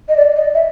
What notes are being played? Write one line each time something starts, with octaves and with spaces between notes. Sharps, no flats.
D#5
D5
D#5
E5